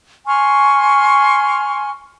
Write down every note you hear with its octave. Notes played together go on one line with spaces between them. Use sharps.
G#5 C6 C#6 F6